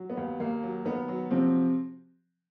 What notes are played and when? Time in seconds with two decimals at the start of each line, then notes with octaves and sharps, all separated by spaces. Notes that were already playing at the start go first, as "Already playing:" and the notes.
Already playing: F#3
0.10 B3
0.17 D#2
0.40 D#2 A#3
0.63 F#3
0.85 D#3 B3
1.08 F#3
1.31 C3 F3 C4